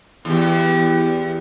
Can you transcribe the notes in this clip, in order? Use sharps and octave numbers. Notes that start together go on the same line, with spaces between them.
E2 B3 G4